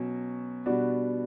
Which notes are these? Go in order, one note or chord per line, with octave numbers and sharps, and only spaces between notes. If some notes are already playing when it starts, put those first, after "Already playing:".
Already playing: B2 F#3 C#4
B2 G3 B3 D4 F#4